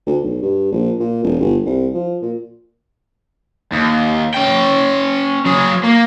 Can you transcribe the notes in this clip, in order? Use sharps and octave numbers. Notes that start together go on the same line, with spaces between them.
D2
B1
G2
A#1
A#2
E1
G1
C2
F3
A#2
D#2
C#4 G5
F#3 G#4
A#3